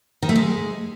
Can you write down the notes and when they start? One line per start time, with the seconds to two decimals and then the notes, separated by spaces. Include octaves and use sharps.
0.22 D#3
0.29 A3
0.36 G#3